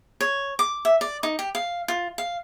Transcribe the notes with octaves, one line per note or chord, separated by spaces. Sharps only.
C#5
D6
E5
D5
D#4
G4
F5
F4
F5